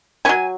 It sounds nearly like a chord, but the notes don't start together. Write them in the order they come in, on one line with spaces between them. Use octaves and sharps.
C#4 G#5 F#3